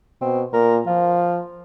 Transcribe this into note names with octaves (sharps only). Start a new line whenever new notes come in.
B2 C4
A#2 A#4
F3 F4